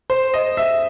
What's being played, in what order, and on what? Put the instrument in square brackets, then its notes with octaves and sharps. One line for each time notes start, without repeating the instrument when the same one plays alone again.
[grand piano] C5
D#5
E5